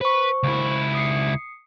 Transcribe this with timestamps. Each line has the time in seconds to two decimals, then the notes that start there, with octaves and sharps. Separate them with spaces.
0.01 B4 C5 C#6
0.43 C#2 E4
0.95 D#6 C7 C#7